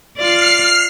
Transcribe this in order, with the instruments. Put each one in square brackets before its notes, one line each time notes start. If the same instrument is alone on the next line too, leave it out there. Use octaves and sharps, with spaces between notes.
[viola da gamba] F4 D5 [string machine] F6 C7